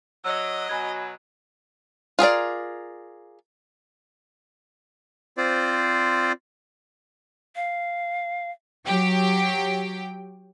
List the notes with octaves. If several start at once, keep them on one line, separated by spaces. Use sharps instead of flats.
F#3 D#5 E6
B2 F#3 G#5 B5 G#6
F4 G#4 A#4 D5
C4 F4 C5 D5
F5
F#3 G4 G5